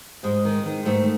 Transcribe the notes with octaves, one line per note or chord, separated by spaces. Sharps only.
G#2 G#3
D#3
D#3
G#2 A3